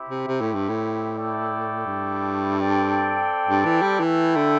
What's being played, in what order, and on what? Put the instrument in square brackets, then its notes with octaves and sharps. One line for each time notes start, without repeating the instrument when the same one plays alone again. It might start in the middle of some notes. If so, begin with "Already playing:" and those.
Already playing: [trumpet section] C4 E4 G4
[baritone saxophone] C3
C3
A2
G2
A2
[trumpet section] A3 E4 A4 D5 G5
[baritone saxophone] G2
[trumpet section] C4 A4 D5 G5
[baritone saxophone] G2
E3
G3
[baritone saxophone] E3 [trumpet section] A3 E4 A4 E5 G5
[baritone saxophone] D3